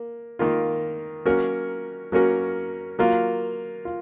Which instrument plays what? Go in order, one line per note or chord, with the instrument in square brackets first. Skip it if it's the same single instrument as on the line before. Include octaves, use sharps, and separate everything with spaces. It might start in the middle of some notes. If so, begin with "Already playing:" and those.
Already playing: [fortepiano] A#3
D#3 A#3 F4
F#3 A#3 C#4 F#4 A#4
F#3 A#3 C#4 F#4 A#4
F#3 A#3 F4
F4